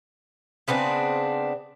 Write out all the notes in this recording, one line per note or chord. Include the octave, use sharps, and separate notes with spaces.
C#3 B3 C4 D4